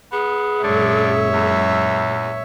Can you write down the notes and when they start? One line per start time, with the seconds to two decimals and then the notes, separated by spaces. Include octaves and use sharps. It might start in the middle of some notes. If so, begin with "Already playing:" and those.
0.12 B3 G#4
0.63 F#2 A#2 D3 G#3 C#5 E5
1.34 E2